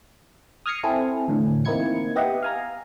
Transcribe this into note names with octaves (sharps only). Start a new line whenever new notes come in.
D#6 F6 G#6 A#6 C7 C#7
C4 E4 A4 G#5
E2 A2 D3
A#3 C4 D#4 E4 G#6 C#7
B3 G4 D#5 E5 F#5
F5 G#5 A#5